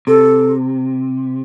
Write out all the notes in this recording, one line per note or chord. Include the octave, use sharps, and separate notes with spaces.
C3 A4